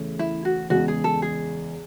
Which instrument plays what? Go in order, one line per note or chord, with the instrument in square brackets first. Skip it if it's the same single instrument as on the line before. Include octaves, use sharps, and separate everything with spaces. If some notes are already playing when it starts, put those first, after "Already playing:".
Already playing: [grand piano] E2 C#3 E3 A3 C#4
[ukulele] E4
F#4
[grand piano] E2 C#3 G#3 B3 [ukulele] F#4
[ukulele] G#4
A4
G#4